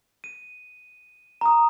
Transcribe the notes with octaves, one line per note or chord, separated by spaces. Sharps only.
D#7
A#5 D#6